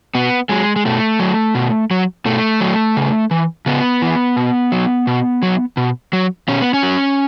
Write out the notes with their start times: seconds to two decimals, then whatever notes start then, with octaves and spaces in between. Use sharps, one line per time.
0.15 B2 B3
0.49 F#3 G#3
0.76 G#3
0.85 B2 A3
1.19 F#3
1.55 B2
1.91 F#3
2.25 B2 A3
2.61 F#3
2.97 C#3
3.31 E3
3.66 C#3 B3
4.02 E3
4.36 B2
4.72 F#3
5.07 B2
5.43 F#3
5.77 B2
6.13 F#3
6.48 B2 C#4
6.61 B3
6.74 C#4
6.83 F#3